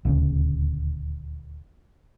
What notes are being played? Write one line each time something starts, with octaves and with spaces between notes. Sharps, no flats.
D#1 D2 C#3